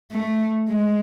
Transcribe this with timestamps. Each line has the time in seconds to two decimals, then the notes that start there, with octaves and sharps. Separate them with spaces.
0.12 A3
0.70 G#3